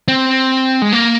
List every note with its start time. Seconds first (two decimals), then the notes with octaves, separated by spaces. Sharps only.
0.08 C4
0.82 G#3
0.92 A#3